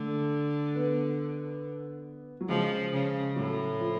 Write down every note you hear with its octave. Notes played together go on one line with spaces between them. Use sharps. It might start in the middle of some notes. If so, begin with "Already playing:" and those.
Already playing: D3 A3
B3
F#3
C#3 F3 G#3
C#3
A2 F#3
F3